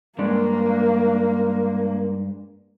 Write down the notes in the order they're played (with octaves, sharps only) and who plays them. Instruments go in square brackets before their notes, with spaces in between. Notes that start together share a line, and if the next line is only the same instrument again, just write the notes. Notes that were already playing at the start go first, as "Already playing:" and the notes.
[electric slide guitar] G2 G#3 D4 [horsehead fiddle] A#3